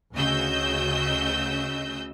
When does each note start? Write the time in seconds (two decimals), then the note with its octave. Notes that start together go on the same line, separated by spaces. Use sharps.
0.13 D2 C#3 F#4 D#5 E6 G6